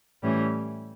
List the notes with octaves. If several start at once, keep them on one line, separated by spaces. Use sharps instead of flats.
A2 E3 G3 C#4